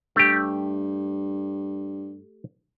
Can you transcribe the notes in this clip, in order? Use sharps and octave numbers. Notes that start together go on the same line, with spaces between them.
G2 A3 G4